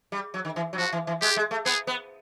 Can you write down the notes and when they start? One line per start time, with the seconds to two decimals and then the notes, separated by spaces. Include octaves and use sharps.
0.12 G3
0.34 F#3
0.45 D#3
0.56 E3
0.73 F#3
0.77 F3 F#4
0.92 E3
1.07 E3
1.21 G#3 G4
1.36 G#3
1.51 A3
1.65 B3 G#4
1.87 B3